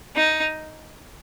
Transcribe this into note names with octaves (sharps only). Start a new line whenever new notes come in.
D#4